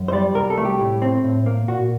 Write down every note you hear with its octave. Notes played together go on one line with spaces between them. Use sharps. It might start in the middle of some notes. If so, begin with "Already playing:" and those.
Already playing: F#2
C5
G3 D5
C2 A#4
A4
A3
G4
A2
C4
A2
A#3
A#2 F#4